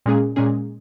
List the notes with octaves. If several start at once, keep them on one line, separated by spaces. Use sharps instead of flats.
A#2 G#3 C#4 G#4
A#2 G#3 C#4 G#4